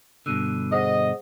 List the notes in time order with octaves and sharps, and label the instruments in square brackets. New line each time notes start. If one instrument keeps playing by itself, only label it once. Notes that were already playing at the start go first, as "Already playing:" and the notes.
[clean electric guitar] G2 B2 D3 [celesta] E6 F#6 D#7
[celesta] G#4 C5 F#5 [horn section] D#5